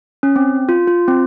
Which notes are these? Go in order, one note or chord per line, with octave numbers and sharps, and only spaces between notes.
C#4
C4
F4
F4
C4